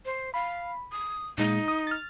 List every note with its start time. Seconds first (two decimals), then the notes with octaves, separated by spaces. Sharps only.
0.05 C5
0.34 F5 B5
0.92 D#6
1.38 A#2 G#3 D#4
1.68 D#6
1.87 F6 A6